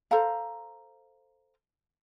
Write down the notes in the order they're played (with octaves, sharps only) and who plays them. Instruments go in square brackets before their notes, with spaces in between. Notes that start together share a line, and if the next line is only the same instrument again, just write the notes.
[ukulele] A4 C5 F5 A#5